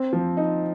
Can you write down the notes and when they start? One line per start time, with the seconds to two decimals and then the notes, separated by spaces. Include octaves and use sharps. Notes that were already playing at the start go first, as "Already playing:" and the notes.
Already playing: C4
0.13 F3
0.37 D#4